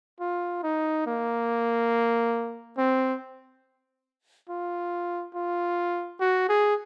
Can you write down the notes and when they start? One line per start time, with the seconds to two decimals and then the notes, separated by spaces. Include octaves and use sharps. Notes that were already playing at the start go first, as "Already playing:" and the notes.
0.20 F4
0.63 D#4
1.06 A#3
2.77 C4
4.49 F4
5.34 F4
6.20 F#4
6.49 G#4